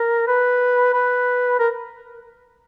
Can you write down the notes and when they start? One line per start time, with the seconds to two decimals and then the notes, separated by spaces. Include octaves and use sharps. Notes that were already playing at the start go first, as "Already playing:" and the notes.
Already playing: A#4
0.27 B4
0.93 B4
1.59 A#4